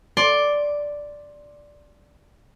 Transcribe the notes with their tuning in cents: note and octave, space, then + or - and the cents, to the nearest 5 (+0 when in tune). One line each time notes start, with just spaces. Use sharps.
D5 +0 C6 +15